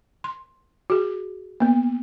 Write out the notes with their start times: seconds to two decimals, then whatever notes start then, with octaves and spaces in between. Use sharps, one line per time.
0.24 C6
0.90 F#4 G#4
1.60 A#3 B3